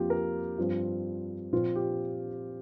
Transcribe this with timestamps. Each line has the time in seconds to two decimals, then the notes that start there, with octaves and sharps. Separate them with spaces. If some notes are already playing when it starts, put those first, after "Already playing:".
Already playing: F2 F3 A#3 F4 G4
0.10 A#4
0.58 G2 F3 C4
1.52 A#2 F3 C4 F4
1.75 G4